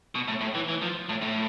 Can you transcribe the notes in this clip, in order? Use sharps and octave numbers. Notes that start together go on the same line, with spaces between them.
B2
A2
A2
E3
E3
F3
A2
A2